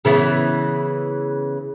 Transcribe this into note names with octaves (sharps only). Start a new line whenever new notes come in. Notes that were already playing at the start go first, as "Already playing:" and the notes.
C#3 E3 B3